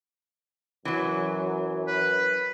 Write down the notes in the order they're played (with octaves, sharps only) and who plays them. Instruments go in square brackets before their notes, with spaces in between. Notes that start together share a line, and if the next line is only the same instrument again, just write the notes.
[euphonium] F#2 [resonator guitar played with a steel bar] E3 F#3
[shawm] B4